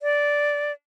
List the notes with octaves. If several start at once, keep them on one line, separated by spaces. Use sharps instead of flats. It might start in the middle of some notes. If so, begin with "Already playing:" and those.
D5